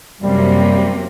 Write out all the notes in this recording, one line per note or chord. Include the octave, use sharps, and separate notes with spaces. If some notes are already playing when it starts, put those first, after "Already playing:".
F#2 C3 G3 A#3